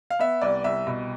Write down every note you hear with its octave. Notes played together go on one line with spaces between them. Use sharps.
F5
B3 E5
C2 D5
C2 E5
B2